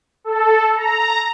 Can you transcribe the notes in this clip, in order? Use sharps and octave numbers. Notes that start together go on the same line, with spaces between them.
A4
A#5